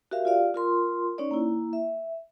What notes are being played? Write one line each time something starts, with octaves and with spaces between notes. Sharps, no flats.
F#4 G4 A#4 E5 F5
F4 G4 D5 F5
F4 A#4 C6
C#4 D#4 C#5 D5
A#3 E4
E5